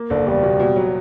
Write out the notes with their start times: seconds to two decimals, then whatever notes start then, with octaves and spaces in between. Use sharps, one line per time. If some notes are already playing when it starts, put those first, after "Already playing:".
Already playing: A#3
0.10 F#1 D3
0.26 E2 G3
0.43 B2
0.60 B2
0.76 F#3